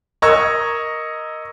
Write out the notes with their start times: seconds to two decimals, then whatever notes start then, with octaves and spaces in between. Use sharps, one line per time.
0.22 A#4 D#5 A#5 C#6 E6 G#6